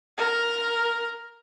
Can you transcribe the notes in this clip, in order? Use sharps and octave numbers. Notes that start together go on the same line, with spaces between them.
A#4